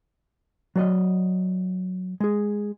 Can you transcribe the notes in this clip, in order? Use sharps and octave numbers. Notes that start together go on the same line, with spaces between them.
F#3 D5 D#5
G#3 G#4